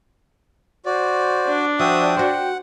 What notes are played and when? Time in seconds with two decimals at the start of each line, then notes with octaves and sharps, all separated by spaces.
0.86 F#4 C5 D5
1.48 D4
1.79 F3 F#4 E5 G5 D#6
2.16 F#4 C5 F#5